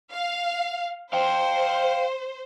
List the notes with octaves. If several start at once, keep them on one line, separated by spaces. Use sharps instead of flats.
F5
C5 F5 G5